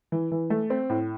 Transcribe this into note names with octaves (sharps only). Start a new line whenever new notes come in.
E3
E3
A3
C4
A2